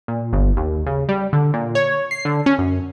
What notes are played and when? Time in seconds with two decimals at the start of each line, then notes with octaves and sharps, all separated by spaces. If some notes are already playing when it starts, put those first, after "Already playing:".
0.08 A#2
0.33 G1
0.57 D#2
0.87 C#3
1.09 G3
1.33 D3
1.54 A#2
1.75 C#5
2.11 C7
2.25 D3
2.46 C#4
2.59 F#2